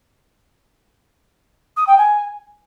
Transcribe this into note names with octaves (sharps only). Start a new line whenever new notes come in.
D#6
G5
G#5